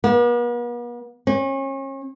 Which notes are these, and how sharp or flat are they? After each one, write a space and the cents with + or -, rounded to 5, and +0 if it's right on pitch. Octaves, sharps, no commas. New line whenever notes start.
B3 -45
C#4 -35